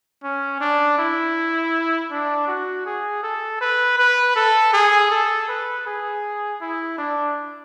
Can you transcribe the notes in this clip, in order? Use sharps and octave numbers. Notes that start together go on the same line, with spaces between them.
C#4
D4
E4
D4
F#4
G#4
A4
B4
B4
A4
G#4
A4
B4
G#4
E4
D4